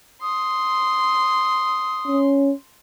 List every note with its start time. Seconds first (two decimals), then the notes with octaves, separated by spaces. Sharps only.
0.22 C6 D#6
2.07 C#4